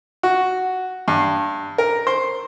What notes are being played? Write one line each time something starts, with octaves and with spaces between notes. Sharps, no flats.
F#4
G2
A#4
C5